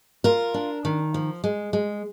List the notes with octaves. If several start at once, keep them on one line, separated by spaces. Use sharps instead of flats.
F4 A#4
D4
D#3
F3
G#3
G#3